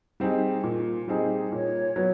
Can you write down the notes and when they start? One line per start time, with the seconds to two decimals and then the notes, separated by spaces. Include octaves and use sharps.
0.20 G3 C4 D#4 G#4
0.63 A#2
1.08 G3 C4 D#4 G#4
1.52 A#2 C#5
1.96 F#3 B3